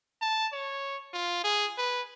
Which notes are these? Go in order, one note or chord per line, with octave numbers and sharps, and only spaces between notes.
A5
C#5
F4
G#4
B4